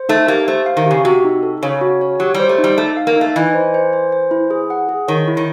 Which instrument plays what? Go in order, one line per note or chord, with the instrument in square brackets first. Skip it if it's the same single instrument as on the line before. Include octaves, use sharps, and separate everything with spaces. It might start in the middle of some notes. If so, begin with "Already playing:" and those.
Already playing: [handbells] C5
[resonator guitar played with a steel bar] A3 [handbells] D#4
[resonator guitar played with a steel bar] A#3 [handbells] G4
[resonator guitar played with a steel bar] A3 [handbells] C5
[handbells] F5
[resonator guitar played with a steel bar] D#3
[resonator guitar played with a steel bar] C#3 [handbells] G4
[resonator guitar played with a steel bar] C3 [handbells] F#4
[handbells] D#4
A4
[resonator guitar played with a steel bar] C#3 [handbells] C#5
[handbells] F#4
C#5
[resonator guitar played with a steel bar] F#3 [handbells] G4
[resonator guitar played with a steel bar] G3
[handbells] C5
[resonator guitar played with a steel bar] A3
[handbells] D#4
[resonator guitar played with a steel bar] G3
[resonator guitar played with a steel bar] A3 [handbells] D#4
[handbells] F5
[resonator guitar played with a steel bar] A#3
[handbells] D#4
[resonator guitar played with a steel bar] A3
[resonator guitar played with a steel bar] E3 [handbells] D#5
[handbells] C5
C5
C5
C5
E4
G#4
F#5
G#4
[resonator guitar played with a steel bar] D#3 [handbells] C#5
[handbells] E4
[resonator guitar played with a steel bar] D#3